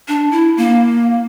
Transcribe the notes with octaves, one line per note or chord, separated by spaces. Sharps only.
D4
E4
A#3